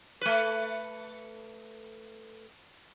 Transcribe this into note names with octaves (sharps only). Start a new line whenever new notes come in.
A3 B4